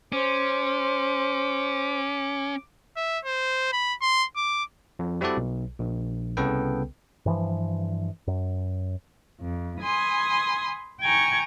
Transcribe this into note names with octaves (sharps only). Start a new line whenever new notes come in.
C#4 C5 D6
E5
C5
B5
C6
D6
F2
G3 C4 E4 F#4 A4 D5
B1
A#1
C2 C#3 B3 A4 B4 G5
G2 E3 F3
F#2
F2
G#5 B5 C6 D#6
G5 G#5 A#5 C#6